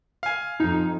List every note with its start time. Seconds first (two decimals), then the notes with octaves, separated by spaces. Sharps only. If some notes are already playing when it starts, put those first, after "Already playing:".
0.23 F5 G#5
0.60 F2 D#4